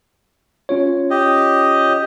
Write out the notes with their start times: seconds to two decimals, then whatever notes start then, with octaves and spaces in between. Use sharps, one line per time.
0.69 C#4 F4 C#5
1.10 G4 D#5